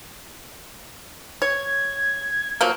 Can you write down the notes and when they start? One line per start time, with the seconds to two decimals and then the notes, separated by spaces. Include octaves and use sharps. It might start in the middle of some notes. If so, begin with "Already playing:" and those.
1.42 C#5 G#6
2.61 F3 F#3 A#3